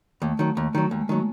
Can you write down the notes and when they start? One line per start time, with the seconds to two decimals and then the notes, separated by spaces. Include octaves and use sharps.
0.22 D#2 A3
0.39 D#3 F#3
0.57 D#2
0.75 D#3 F#3
0.91 D#2 G#3
1.01 A3
1.09 D#3 F#3 A#3